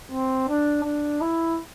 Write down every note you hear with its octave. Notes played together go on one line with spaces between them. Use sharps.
C4
D4
D4
E4